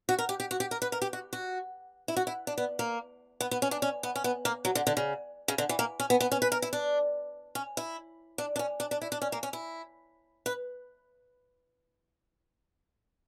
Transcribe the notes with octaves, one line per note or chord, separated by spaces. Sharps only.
F#4
A#4
G4
G4
F#4
G4
A#4
B4
A#4
G4
F#4
F#4
E4
F#4
E4
D4
B3
A#3
B3
B3
C#4
D4
C#4
B3
C#4
B3
A#3
F#3
D3
D3
C#3
C#3
D3
E3
A#3
C#4
B3
B3
C#4
B4
A#4
E4
D4
C#4
E4
D4
D4
C#4
D4
D4
E4
D4
C#4
A#3
C#4
E4
B4